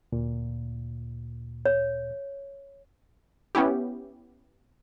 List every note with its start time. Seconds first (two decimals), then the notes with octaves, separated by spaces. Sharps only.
0.12 D2 A#2
1.66 C#5
3.55 B3 C#4 E4 G4